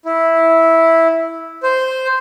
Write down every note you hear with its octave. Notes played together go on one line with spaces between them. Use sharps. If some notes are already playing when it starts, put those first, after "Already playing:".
E4
C5